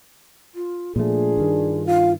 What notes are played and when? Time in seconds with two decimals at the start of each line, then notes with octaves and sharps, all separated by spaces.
0.55 F4
0.96 A#2 F3 A3 D4 F4 G#4
1.37 G2 D#3
1.86 F4 F5